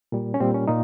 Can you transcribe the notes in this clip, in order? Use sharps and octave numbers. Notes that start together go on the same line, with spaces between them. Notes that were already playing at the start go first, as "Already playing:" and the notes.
A#2 G3
C#4
A#2 G3 C4
C#4
A#2 D#4